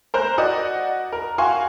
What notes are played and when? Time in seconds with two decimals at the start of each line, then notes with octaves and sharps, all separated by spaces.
0.14 A#4 C5 A#5 F#6 G6
0.38 F#4 D5 D#5 F#5
1.13 A#4
1.38 F#4 F5 G#5 C6 C#6